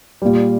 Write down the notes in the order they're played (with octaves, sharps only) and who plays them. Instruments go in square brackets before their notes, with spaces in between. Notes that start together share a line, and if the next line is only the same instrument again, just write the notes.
[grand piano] A#2 G3